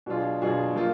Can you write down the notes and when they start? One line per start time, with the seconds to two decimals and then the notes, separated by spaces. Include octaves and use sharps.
0.06 B2 F#3 D4 F4 G#4
0.41 B2 F#3 D4 F4 G#4
0.76 F3 A#3 F4